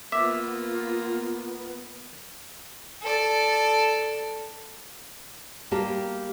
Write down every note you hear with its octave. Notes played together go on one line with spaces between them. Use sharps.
A#3 B3 F4 E5 D6
A4 D5
G3 A#3 G4 A5